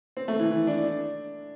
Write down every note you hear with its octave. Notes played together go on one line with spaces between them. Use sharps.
C4
A3
E3
E3
D4
D4